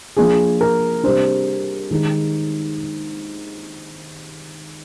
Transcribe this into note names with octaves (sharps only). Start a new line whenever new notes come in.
F3 A#3 D4 G#4
A#4
C3 G3 D4 C5
D#3 G#3 D#4